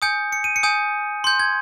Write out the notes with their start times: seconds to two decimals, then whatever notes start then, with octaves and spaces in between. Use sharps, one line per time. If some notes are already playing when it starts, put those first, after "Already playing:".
0.02 G#5 D#6 G6 C#7
0.32 C#7
0.44 D#7
0.56 C#7
0.63 G#5 D#6 G6
1.24 C6 G6
1.39 G#6